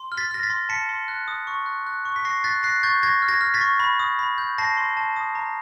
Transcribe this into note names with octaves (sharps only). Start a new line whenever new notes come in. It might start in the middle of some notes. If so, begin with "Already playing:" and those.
Already playing: C6
F6
A6 B6
F6 A#6
A6 B6
C6
A5 B6 C#7
C6
F#6
D#6
C#6
F#6
F#6
C#6
B6
C#6 A#6 C7
F#6 A6 B6
F#6 A#6 C7
C#6 G6 A6
C#6 G#6 A#6
F6
G#6 A#6
F6
A6 B6
C#6
B5
D#6
B5
G6
A5 A#6 C7
C6
A5
D#6
A#5